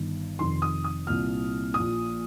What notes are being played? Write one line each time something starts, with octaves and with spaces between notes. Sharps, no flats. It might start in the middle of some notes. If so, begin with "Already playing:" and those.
Already playing: G1 G2 D#3
F1 F2 D#3 C6
D#6
D#6
C2 A#2 F6
A#2 D#6
A#1